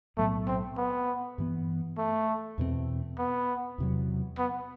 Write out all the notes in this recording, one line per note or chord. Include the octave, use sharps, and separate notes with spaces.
B1 A2 F#3 A3 B3
C4
B3
G2 E3 B3
A3
E2 B2 A3 C4
B3
E2 C3 F#3
B3